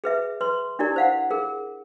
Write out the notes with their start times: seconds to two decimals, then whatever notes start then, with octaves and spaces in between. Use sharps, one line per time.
0.04 G#4 B4 E5
0.41 B4 C6
0.79 D4 E4 G4 A#4 D5
0.96 C5 F5 F#5
1.30 G#4 A#4